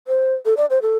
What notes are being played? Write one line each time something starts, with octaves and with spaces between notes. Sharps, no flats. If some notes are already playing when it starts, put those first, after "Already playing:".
C5
A4
D5
C5
A4